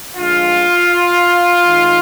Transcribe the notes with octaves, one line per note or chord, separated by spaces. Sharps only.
D3 F3 G#3 F4
D#3 G#3 D#4